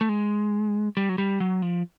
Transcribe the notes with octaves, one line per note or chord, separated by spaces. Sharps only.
A3
G#3
G3
F#3
G3
F#3
F3